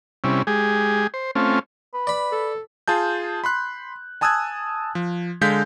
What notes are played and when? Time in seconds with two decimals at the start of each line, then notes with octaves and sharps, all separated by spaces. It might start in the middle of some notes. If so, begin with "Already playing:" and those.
0.24 C3 G3 C#4 E4
0.47 G#3 G4 G#4
1.14 C5
1.35 A3 C4 C#4 F4
1.94 B4
2.07 D5 B5
2.32 A4
2.88 F4 G#4 A5 G6
3.44 B5 C6 F#6
4.21 G#5 A5 D#6 E6 F#6 G#6
4.95 F3
5.41 D3 G#3 F5 G6 B6